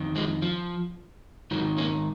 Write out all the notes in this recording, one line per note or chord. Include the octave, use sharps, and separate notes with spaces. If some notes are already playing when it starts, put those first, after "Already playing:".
Already playing: F2 D#3
F3 G#3
F3
G#2 D#3 F#3
A#3 C#4